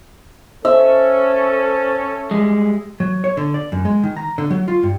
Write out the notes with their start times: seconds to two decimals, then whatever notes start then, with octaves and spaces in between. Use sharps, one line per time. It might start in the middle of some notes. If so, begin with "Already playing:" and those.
0.65 C#4 A4 C5 E5
2.31 G3 G#3
3.00 F#3
3.24 C#5
3.37 D3
3.54 D5
3.72 F#2
3.85 G#3
4.03 D#3
4.17 A#5
4.38 D3
4.50 F#3
4.68 F4
4.83 G2